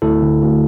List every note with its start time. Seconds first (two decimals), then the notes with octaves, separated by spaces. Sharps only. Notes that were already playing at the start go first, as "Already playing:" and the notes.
0.02 D2 E4 A4
0.22 D3
0.42 D2